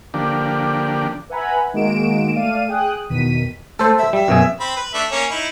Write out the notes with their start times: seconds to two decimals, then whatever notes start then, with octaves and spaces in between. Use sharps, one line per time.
0.14 D3 F3 A#3 D4 G4
1.30 B4 E5 F#5 G#5 A#5 B5
1.73 D#3 G#3 A#3 F#4 D7 E7
2.35 A3 D5 F5 D#7
2.68 G#4 G5 D#6 F#6
3.10 E2 B2 D#3 B6 D#7
3.79 A3 A4 C5
3.98 E5
4.13 G3 E5
4.28 F#2 B2 G#4
4.60 C4 B5
4.76 B4
4.94 A3 D4 E5
5.12 A#3 C#4 C#5
5.31 D#4 E4